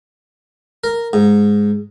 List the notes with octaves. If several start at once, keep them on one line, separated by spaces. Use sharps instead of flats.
A#4
G#2